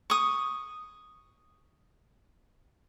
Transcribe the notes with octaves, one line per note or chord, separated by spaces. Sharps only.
C#6 D#6